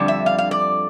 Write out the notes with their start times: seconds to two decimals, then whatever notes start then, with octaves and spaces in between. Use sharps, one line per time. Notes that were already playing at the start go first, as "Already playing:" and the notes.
Already playing: F2 D3 G3 D4
0.08 E5
0.26 F5
0.38 F5
0.51 D5